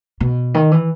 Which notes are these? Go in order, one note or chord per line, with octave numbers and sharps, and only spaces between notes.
B2
D#3
E3